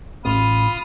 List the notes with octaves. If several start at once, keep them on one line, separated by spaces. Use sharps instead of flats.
A1 F4 B5 D#6